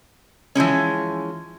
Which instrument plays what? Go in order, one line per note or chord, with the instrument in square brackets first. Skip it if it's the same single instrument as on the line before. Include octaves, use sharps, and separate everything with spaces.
[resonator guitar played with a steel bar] E3 F3 G#3 C#4